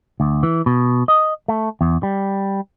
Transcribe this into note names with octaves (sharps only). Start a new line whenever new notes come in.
D2
E3
B2
D#5
A3
E2
G3